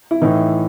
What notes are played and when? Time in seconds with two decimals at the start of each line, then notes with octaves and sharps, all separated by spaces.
0.11 E4
0.22 A2 E3 D#4